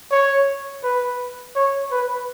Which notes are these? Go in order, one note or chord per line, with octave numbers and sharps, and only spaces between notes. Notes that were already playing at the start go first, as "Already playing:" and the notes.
C#5
B4
C#5
B4